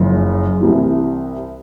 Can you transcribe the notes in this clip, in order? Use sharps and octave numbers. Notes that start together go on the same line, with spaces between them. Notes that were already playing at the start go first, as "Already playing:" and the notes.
Already playing: F#1 F#2 C#3 F3
C2 C3 E3